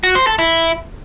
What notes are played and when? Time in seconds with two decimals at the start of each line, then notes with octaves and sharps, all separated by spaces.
0.04 F#4
0.15 C5
0.27 A4
0.39 E4